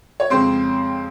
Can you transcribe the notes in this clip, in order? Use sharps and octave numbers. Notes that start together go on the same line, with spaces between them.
C#5
F2 C#3 G#3 C4 C5